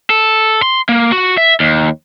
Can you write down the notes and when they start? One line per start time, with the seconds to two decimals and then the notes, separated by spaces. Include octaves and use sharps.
0.10 A4
0.63 C6
0.89 A#3
1.12 F#4
1.38 E5
1.60 D#2